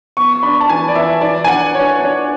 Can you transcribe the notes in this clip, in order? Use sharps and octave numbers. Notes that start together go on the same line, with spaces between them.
B3 C#6
D4 B5
A5
E3 G#5
D5
E3 E5
E3 D5
G#5
D4 F#5
D4 C#5
D4 C#5